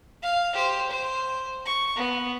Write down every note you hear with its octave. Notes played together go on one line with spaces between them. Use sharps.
F5
G4 C5
C5
C#6
B3